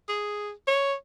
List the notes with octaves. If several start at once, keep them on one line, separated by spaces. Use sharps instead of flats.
G#4
C#5